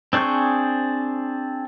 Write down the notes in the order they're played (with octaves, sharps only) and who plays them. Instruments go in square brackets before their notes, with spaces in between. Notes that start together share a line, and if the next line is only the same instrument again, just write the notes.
[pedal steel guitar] C4 D4 G#4 C#6 G6